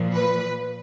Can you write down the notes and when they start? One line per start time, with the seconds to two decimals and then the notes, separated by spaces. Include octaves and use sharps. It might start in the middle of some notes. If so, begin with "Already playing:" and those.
Already playing: A#2 F3
0.14 B4